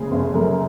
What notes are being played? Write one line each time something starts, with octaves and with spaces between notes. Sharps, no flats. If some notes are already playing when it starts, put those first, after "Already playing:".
Already playing: F#1 C#3 G#4
F#1
F#2 A#4